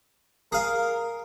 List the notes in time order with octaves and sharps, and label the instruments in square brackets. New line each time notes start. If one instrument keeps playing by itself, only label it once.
[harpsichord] G#4 F5 [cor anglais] A#4